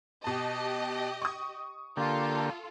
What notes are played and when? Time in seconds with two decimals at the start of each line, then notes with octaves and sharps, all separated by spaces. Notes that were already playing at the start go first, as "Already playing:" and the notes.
0.24 B2 G4 D#5 A5
1.22 C#6 D#6
1.97 D3 A#3 F4 G4 A4